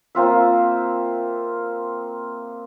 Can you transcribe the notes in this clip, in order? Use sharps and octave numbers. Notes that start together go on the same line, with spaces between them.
A#3 C4 F4 E5